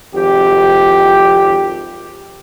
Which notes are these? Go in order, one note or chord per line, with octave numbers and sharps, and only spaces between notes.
G#1 F2 G4